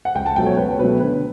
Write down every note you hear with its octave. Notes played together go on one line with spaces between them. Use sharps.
F#5
C#2 G5
A5
B2 F#3 A3 G5
C#5
C#2 B4
B2 F#3 A3 B4
D3 B4